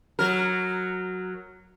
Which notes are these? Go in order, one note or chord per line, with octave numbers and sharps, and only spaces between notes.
F#3 A#4